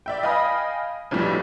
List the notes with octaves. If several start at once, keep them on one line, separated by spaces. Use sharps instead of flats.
D5 E5 G5
D#5 F5 G5 G#5 B5 D#6
B1 F2 A2 G3